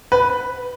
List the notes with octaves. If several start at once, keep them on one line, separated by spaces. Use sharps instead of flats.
B4